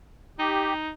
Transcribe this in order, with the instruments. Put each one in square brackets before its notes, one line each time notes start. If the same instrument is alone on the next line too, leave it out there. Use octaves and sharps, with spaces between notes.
[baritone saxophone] D#4 [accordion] G4